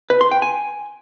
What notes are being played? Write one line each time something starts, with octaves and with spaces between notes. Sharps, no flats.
B4
C6
G5
G#5